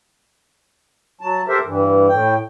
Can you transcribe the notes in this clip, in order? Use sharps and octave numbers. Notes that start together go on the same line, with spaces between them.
F#3 A5
G4 A4 A#4 C5 E5
G2 E3
A2 G5